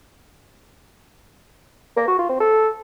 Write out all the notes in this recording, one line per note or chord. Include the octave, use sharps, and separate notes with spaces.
A#3
F#4
F4
C4
A4